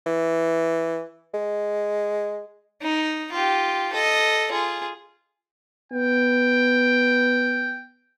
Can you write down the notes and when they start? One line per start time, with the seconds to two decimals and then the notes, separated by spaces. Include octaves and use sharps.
0.06 E3
1.34 G#3
2.82 D#4
3.32 F4 G4
3.93 A4 D#5
4.52 F4 G#4
5.92 B3 G5